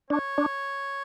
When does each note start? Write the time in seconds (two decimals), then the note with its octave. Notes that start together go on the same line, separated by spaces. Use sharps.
0.10 D4 C#5
0.38 D4